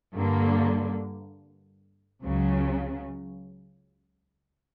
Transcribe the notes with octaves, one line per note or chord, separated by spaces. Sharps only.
G2 D3 A#3
C#2 C#3 F#3